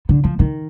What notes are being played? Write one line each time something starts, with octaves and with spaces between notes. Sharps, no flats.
D3
F3
D#3